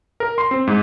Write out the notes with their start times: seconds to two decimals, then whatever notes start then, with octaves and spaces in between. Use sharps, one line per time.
0.20 A#4
0.38 C6
0.51 C4
0.67 G#2